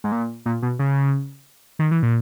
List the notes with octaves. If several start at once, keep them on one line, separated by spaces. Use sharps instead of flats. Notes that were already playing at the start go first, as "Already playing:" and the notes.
G#2
A#2
A#2
B2
C#3
D#3
E3
A#2